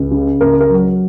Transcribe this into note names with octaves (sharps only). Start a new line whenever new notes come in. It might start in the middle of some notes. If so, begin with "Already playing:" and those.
Already playing: C#2
C#3
C#2 A#4
A#4
F#3